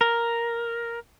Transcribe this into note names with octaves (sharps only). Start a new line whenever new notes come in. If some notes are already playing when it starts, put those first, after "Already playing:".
A#4